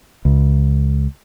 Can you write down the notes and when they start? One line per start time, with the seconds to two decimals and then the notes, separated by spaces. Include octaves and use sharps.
0.25 C#2